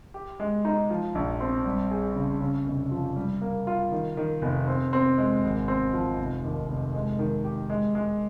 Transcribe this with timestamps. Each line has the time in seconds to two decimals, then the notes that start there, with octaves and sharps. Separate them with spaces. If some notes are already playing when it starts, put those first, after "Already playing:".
0.14 G4
0.40 G#3
0.65 D#4
0.90 F3
1.15 A#1
1.40 C4
1.65 G3
1.91 G#4
2.16 C#3
2.41 C#3
2.66 F1
2.91 F3
3.16 G3
3.41 A#3
3.67 F4
3.92 D#3
4.17 D#3
4.42 F1
4.68 C4
4.93 C4
5.18 G#3
5.44 G#1
5.68 C4
5.93 F3
6.18 F1
6.44 D#2
6.69 F1
6.94 G#3
7.19 D#3
7.44 G4
7.70 G#3
7.95 G#3